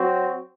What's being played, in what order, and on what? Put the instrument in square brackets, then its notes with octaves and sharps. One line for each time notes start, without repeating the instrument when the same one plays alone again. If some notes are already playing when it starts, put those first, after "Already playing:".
Already playing: [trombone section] F#3 C4 F#4